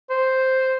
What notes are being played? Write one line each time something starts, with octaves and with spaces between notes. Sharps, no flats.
C5